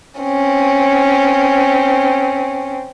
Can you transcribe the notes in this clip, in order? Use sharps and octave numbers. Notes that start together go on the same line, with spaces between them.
C4 C#4